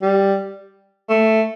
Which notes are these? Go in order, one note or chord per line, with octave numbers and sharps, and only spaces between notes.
G3
A3